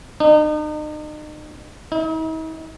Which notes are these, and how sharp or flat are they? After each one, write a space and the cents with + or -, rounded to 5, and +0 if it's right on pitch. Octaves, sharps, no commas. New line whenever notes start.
D#4 -40
D#4 +45